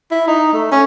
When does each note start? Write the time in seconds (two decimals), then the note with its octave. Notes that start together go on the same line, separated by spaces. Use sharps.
0.11 E4
0.28 D#4
0.53 A3
0.71 C#4